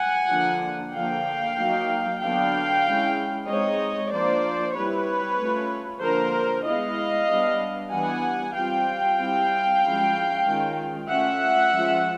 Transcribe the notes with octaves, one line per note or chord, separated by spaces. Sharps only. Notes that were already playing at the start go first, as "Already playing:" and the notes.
Already playing: F#5 G#5
D3 F3 A#3 D4 F4
D3 F3 A#3 F5 G5
F#3 A#3 D#4
D3 F#3 B3 D4 F5 G5
G#3 C#4 E4
G#3 C4 D#4 C#5 D#5
F3 A#3 D4 F4 C5 D5
G3 C4 E4 B4 C#5
A3 C#4 F4
D3 F3 A#3 A#4 C5
G#3 B3 E4 D#5 F5
G3 B3 D4
E3 G3 B3 D4 F#5 G#5
G3 C4 F4 F5 G5
G3 C4 E4
F3 G#3 C#4 E4
D#3 G#3 C#4 F4
A3 C#4 F4 E5 F#5
F3 G#3 C#4 F4